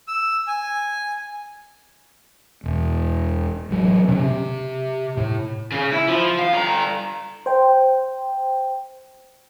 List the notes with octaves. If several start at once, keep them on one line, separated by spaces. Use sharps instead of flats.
E6
G#5
E1
A1 F#3
C3 C#4
C3
A2
C#3
E4
F3
F5
D3 A#5
C5 G5